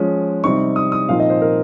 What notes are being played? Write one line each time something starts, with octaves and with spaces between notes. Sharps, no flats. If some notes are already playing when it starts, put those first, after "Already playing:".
Already playing: F3 G#3 C#4
C3 G3 C4 D#4 C#6
D#6
D#6
A#2 F3 C4 D#4 F5
D#5
C5
A#4